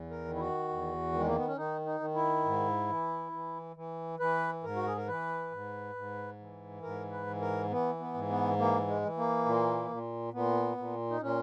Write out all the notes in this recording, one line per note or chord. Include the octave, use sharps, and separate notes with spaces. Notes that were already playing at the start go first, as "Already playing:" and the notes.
Already playing: E2
A#4
D#3
E4
F#4
E2
D#3 G#3
A#3
B3
C#4
D#3 D#4
D#4
D#3
E4
G#2
E3
E3
E3
E3 B4
G#2 A#4
F#4
G#4
A#4
E3 B4
G#2
G#2
E3
G#2 A#4
B4
E3
A#4
E3 B3
B3
G#2
B3
E3 A#3
G#3
E3
A#3
A#2
A#2
A#2 B3
A#2
D#4
A#2 C#4